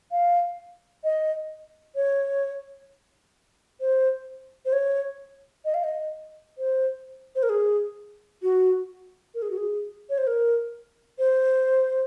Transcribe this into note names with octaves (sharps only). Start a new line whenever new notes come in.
F5
D#5
C#5
C5
C5
C#5
D#5
F5
D#5
C5
C5
A#4
G#4
F#4
A#4
G#4
F#4
G#4
C#5
C5
A#4
C5